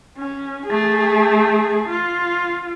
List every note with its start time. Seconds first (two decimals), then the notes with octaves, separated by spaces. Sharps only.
0.18 C#4
0.67 A3 G#4
1.90 F4